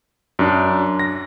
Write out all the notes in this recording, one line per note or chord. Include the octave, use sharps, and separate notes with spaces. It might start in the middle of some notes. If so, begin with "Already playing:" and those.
F#2 D4
A#6